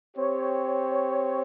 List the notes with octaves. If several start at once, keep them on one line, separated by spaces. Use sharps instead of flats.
C4 G4 C#5